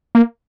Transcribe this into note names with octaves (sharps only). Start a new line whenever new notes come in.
A#3